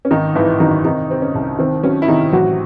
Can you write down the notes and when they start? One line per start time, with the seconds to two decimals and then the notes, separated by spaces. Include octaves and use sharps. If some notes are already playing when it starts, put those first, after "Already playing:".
0.05 C#4
0.11 G#1 D#3 D#4
0.35 G#1 E3 E4
0.60 F#2 D#3 D#4
0.84 C3 D#3 D#4
1.09 C3 C4
1.22 C#4
1.35 C2
1.59 D#3 C4
1.83 F#3 C#4
2.02 E4
2.08 C3 D#3 D#4
2.32 A1 F#3 F#4